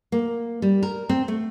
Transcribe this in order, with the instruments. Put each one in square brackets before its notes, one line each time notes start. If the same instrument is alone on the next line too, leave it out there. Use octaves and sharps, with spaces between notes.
[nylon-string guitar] A#3
G3
A#4
C4
A3